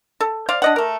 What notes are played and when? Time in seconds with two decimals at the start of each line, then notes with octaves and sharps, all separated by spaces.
0.20 A4
0.49 C5 D5 F5
0.62 D4 D#5 F#5
0.76 A3 A#4